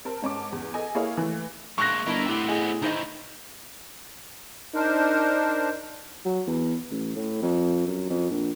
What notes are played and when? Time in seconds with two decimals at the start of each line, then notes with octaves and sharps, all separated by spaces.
0.05 C4 A#4 A5
0.22 G#2 C#4 A5 D6
0.52 E2
0.74 A4 D#5 G#5
0.95 A#3 E4 G#4 A4 C#5 F5
1.17 E3 A3
1.78 G#3 A#3 C#6 F#6 A#6
2.06 G1 D4 E4 A#4 D#5 E5
2.28 A2 B3 C4 G4
2.48 G#4 D#5
2.82 D#3 E3 D#4 C5 D#5
4.75 D4 D#4 A#4 C5
6.25 F#3
6.47 E2
6.91 A1
7.16 A2
7.42 F2
7.87 F#2
8.09 F2
8.30 A#1